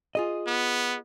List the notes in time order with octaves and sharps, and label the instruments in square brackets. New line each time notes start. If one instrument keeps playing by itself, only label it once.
[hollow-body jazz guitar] F4 G#4 D#5
[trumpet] B3